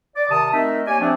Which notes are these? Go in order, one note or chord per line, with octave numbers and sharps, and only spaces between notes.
D5
C3 D#3 A5 D#6
A3 C4 D#4 A#4 D#5 E5
A#3 G4 C#5 D5 G#5
F3 A3 C4 D4